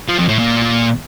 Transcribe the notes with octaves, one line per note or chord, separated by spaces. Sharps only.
F3
F2
A2
A#2